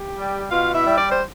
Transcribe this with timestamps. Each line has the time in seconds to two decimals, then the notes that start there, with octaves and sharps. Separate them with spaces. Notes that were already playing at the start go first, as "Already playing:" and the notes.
Already playing: G4
0.17 G3
0.51 B2 F4 F5
0.75 E4 E5
0.85 G3
0.96 D5
1.10 C5